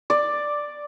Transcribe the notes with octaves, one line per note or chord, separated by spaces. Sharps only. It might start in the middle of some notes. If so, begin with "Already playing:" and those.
D5